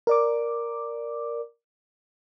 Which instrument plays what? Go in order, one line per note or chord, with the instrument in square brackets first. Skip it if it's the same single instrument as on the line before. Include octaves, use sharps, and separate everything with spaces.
[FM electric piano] A#4 D5 D6